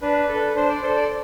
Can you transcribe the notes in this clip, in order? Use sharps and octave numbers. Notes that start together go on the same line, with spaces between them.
D4 B4
A4 B4
D4 C5
D5
A4 C5
D5